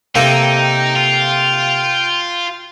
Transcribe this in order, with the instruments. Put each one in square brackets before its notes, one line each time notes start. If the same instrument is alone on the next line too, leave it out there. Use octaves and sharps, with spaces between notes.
[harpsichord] C3 A#3 A4 [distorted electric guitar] D#4 [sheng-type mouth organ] G5
[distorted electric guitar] F4